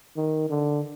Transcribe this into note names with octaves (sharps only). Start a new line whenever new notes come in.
D#3
D3